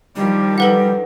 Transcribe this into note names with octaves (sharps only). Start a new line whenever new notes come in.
D#3 F3 G3 D4
A4 B4 F#5